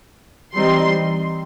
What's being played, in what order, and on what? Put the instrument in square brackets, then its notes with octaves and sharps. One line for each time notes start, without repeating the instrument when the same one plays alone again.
[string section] E3 G3 C4 D#4 C6